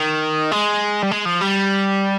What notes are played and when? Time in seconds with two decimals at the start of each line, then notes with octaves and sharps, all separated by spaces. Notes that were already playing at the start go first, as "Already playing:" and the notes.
Already playing: D#3
0.52 G#3
1.02 G3
1.11 G#3
1.25 F3
1.41 G3